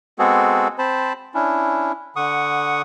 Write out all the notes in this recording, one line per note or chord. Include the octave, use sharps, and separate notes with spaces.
G#3 B3 C4 F#4 G#4 A4
C4 C5 A5 B5
C#4 D4 E4
D3 F#5 C#6 D#6